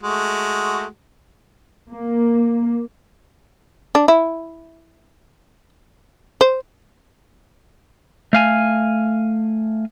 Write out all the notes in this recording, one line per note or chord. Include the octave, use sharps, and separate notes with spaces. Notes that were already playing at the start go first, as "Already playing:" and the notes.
G#3 A3 F#4
A#3
D4
E4
C5
A3 F5 G#5